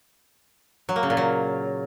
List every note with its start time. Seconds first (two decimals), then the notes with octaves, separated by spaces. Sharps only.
0.89 F#3
0.96 A#3
1.03 C#3
1.10 A#2
1.17 F#3